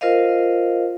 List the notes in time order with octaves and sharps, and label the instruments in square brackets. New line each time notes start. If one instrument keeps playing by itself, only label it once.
[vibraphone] F4 A#4 C5 D#5 F5